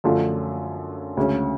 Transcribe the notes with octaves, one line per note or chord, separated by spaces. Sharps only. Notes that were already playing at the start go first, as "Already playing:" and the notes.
F#2 D3 F3 A3 F4
D2 C#3 G#3 C#4